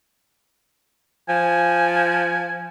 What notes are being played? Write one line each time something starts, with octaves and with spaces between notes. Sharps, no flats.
F3 G#5